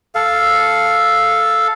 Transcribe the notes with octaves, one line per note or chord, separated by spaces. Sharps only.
A4 F5